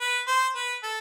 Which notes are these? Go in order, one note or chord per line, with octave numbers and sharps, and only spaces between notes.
B4
C5
B4
A4